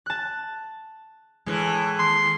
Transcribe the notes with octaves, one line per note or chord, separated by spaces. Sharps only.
A5 F#6
A2 E3 G#3
D#2 C6